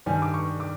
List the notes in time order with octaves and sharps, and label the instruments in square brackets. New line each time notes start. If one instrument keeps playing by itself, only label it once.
[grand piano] G2 D#3 G3 G#5
D6
C#6
D6